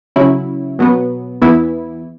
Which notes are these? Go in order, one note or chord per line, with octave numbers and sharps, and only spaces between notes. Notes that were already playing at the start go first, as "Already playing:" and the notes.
C#3 F#3 C#4 E4
B2 F#3 B3
E2 E3 B3 E4